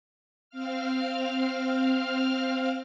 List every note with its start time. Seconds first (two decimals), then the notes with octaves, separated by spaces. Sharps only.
0.50 C4 F5 F6